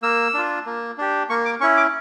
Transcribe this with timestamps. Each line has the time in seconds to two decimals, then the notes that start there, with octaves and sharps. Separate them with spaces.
0.03 A#3 E6
0.34 D4 F4
0.66 A#3
0.98 D4 G4
1.30 A#3 C#6
1.45 D6
1.61 C#4 E4 C#6
1.77 D6